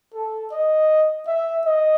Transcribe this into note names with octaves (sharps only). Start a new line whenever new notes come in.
A4
D#5
E5
D#5